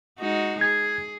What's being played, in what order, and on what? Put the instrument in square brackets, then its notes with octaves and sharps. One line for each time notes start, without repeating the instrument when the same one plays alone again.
[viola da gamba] G#3 D#4 F#4
[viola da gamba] G#4 [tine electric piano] G#6